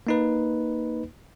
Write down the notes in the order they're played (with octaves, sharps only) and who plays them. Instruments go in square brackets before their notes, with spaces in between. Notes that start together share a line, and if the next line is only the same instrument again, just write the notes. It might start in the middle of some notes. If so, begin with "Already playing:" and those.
[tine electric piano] A#3 D#4 B4